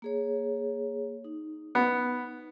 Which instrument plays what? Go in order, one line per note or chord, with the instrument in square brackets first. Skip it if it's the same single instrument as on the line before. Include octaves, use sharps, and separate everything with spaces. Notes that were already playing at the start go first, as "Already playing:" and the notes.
[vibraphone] A#3 G#4 C#5
D#4
[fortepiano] B3